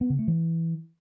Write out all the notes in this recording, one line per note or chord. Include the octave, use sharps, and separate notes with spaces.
B3
C#3
A3
E3